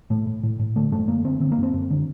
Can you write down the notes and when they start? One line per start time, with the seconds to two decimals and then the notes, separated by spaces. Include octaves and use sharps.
0.10 A2 A3
0.27 A2
0.43 A2
0.59 A2
0.76 D3 A3
0.92 F#2 A3
1.08 F#2 A#3
1.24 D3 C4
1.40 D3 C4
1.52 A#3
1.58 F#2
1.63 C4
1.74 F#2
1.90 D3